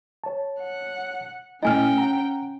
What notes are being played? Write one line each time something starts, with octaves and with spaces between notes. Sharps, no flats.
C#5 A5
F#5
A#2 A3 C#4 E4 D#5 G5 G#5 F6
F#5 A#5